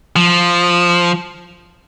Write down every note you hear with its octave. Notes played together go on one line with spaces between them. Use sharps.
F3